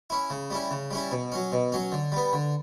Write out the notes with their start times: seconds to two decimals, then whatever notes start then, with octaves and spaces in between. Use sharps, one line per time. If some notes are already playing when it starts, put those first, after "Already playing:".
0.10 C#4 E4
0.30 C#3
0.50 G3 C#4 E4
0.71 C#3
0.91 G3 C#4 E4
1.11 B2
1.32 F#3 C#4
1.52 B2
1.72 F#3 C#4
1.92 D3
2.12 G3 B3
2.33 D3